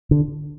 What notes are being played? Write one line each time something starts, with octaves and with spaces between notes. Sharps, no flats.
D3